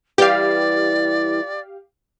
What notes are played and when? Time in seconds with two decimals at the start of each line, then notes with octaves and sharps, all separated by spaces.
0.18 E3 G3 G4 D5 F5